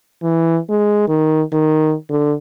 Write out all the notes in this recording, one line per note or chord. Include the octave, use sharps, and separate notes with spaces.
E3
G#3
D#3
D#3
D3